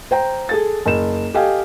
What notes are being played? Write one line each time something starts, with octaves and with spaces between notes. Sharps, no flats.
C5 G5 A#5
G#4 A4 A6
F#1 E7
G4 A4 D#5 F5 G5 G#5